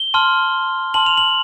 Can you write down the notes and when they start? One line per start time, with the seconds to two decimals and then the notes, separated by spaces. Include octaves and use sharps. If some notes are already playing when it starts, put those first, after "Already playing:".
Already playing: G7
0.14 A5 C6 F6
0.94 A5 C6 F6 F#7
1.06 F7
1.17 F#7